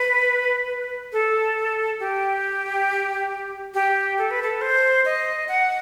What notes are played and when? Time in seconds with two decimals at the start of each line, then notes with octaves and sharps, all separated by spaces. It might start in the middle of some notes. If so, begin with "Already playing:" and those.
Already playing: B4
1.12 A4
2.00 G4
3.74 G4
4.18 A4
4.31 B4
4.43 A4
4.61 C5
5.05 D#5
5.48 F#5